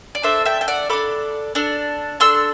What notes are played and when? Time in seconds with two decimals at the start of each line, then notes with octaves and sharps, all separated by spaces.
0.15 D5
0.23 D4 A4 C5 E5
0.45 E5 G5
0.61 G5
0.68 D5 F#5
0.90 D4 A4 B5 D6
1.55 D4 A4
2.20 D4 A4 C6 E6